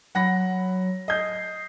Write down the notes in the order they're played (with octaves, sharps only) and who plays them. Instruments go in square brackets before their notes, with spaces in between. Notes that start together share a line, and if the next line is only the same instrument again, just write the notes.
[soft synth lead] F#3 [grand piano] F#5 B5 A#6
[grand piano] D#5 G6 [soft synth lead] C7